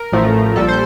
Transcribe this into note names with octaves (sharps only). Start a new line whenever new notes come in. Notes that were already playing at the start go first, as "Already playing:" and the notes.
Already playing: A#4
A1 A2 F3 A3
A#1 A#2 G3 A4
C5